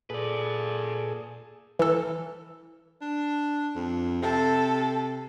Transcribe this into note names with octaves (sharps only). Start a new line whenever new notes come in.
A#2 G#4 A4 B4 D5
E3 A4
D4
F2
C3 A4